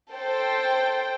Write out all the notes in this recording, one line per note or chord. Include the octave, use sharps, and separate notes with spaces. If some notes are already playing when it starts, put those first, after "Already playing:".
A4 C5 G5